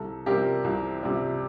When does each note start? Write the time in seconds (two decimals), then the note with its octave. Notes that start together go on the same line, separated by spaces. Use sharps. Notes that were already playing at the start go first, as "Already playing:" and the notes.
Already playing: C2 A4
0.26 C3 G3 G4 A#4
0.64 C2
1.03 C3 G3